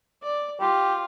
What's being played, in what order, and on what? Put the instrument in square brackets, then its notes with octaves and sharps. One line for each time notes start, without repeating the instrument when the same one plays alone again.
[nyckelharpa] D5
[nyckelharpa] F4 [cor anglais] G4